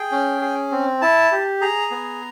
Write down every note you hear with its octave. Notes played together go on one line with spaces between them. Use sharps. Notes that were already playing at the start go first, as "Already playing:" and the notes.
Already playing: G#4 G5
C#4
G#4
C4
E4 A5
G4
G#4 A#5
B3